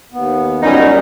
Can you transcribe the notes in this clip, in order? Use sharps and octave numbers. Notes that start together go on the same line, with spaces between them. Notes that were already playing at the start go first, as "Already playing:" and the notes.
D#2 B3
F#2 A#2 G3 C#4 D#4 E4